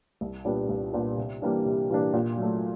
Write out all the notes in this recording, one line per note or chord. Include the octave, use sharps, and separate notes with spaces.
C2
A#2 G3 B3 D4
C2
A#2 G3 B3 D4
C3
E3 G3 A#3 D4
C3
E3 G3 A#3 D4
A#2
F#3 A3